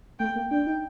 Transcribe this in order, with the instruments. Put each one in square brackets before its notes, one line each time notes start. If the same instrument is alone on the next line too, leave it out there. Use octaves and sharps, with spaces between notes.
[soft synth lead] A3 [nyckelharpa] G5
[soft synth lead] A#3
[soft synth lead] D4 [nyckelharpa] G5
[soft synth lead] D#4